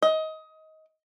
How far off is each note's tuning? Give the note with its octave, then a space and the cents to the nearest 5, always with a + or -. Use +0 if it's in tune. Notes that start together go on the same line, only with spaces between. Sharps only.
D#5 +20